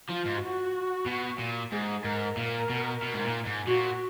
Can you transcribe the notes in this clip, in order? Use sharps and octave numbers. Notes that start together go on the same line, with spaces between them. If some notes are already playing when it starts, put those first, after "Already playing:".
F3 F4
G#2
F#4
B2
A#2
G#2 G#4
G#2 A#4
A#2 A#4
B2
B2
G#2
A#2
G#2
A#2 F#4